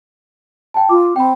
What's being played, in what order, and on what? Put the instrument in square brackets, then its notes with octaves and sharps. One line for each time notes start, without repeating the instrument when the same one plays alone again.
[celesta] G5 A5
[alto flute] F4 [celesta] D6
[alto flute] C4 [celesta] G5 B5